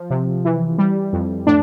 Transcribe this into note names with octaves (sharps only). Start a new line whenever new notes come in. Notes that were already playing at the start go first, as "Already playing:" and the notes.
Already playing: F3
C3
E3
G3
F2
A2 D4